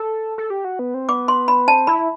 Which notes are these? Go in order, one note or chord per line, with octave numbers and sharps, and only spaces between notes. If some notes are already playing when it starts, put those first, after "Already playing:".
Already playing: A4
A4
G4
F#4
B3
C4
B3 D6
C6
B5
C4 A5
E4 B5